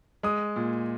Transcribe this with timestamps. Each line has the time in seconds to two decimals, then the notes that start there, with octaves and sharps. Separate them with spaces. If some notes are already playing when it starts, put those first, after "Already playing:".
0.23 G#3 D#6
0.56 A#2